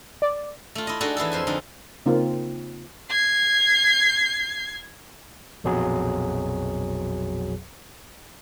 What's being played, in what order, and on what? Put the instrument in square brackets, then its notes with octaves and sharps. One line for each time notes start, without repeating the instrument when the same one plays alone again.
[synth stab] D5
[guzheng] A3 F4
E4 D#5
D4 D#4 F#4 G#4 A4 D#5
E3 E4 G#4 A4
F2 C5 G#5
F2 D3 D#4
[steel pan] C#3 A#3 C4 D#4 F4
[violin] G#6 C7
[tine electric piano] A#1 F2 B2 F#3 G#4